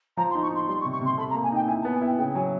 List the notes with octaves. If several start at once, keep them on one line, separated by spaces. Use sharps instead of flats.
F3 A#5
C6
D#4
C#6
D#4 C6
G3 C6
C#6
C3
C#6
C3 C6
A4 B5
A#5
A#3
G#5
D#4 G5
E4 G#5
A5
B3
G#5
E4 G5
C#3 G5
F#3 G#5